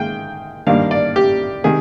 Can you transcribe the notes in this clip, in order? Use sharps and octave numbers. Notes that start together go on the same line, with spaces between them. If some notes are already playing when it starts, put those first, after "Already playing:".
Already playing: G#2 D#3 A#3 G#4 G5
G2 D#3 A#3 D4 F5
D5
G4
C3 D#3 G#3 G#4